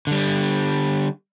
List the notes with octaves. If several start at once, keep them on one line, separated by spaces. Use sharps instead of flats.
D3 G3